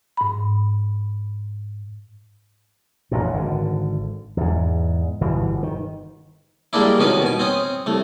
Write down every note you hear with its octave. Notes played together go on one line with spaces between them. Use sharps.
G#2 B5
A1 F#2 A#2
G#1 D3
E2 G#2
G1 B2 E3
D#3
G3 G#3 A#3 D4 E4
C2 B2 D#3 B3 C#4 B4
B2 G#5
C4 C#4 D#6
C2 A3